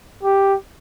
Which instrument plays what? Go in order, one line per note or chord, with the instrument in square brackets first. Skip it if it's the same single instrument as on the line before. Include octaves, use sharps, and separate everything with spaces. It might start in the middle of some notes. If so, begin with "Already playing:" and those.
[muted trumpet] G4